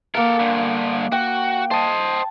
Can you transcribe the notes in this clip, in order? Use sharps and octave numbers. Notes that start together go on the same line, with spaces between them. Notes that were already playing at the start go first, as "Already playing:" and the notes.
A#3 A4 A#4 F#5
G2 D3
F#4 G5
C5 D#5 A5